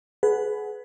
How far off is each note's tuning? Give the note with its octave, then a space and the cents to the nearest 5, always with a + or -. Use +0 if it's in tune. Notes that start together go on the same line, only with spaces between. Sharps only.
G#4 +35 B4 +10 F#5 +0